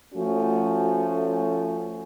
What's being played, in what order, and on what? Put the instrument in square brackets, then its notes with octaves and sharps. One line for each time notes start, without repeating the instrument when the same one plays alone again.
[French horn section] F3 A3 C#4 F#4